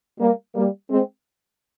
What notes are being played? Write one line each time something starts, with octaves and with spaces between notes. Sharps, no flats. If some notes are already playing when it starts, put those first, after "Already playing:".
G3 A#3
G3 A#3
G#3 C4